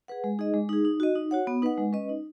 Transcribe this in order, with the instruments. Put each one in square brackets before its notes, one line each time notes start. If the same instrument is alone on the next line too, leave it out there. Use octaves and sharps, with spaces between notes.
[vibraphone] G#4 B4 F#5
G#3
D#4 G#4 D#5
G#3
D#4 G#4
D#4
F#4 D#5
D#4
F#4 C#5 F#5
B3
D#4 B4 D#5 F#5
G#3
C#4 B4 D#5
D#4